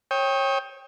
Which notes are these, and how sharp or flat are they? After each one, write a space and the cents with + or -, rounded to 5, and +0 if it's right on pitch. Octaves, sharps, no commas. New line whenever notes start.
C#5 -25 G5 +10 D#6 +25